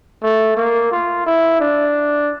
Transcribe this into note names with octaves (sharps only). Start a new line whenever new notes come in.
A3
A#3
F4
E4
D4